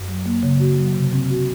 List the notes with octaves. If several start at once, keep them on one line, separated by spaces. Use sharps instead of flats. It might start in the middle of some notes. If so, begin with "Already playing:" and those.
Already playing: F#2
F#3
A#3
C#3
F#4
F#3
C3
C4
F#4